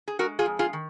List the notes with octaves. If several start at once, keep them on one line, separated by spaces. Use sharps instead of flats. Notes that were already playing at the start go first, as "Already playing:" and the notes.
G#4
G#3 F#4 A#4
F4 G#4
F2
F4 G#4
D#3